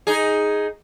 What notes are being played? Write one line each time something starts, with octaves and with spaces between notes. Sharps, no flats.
D#4 G#4